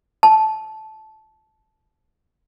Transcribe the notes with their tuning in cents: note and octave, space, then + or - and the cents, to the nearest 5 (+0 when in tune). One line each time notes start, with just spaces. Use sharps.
A5 -15